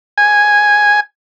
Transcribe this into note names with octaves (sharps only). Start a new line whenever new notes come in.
G#5